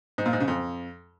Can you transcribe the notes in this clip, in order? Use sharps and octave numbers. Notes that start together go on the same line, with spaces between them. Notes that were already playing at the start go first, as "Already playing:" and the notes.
G#2
A#2
G#2
C#3
F2